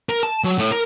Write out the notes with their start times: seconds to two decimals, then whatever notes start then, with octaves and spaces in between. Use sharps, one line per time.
0.09 A#4
0.23 A5
0.44 F#3
0.58 A2
0.72 A#4